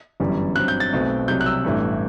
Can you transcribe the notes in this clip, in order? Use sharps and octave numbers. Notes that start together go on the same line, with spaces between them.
G1 F#2 E3 G3
G2 F#3 C4 F#6
G6
A6
B1 B2 A3 C4
C2 C3 F#3 G6
F#6
E6
A1 G2 E3 A3